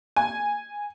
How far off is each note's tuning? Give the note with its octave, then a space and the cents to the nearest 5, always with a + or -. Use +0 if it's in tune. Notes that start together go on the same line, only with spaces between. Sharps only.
G#5 -10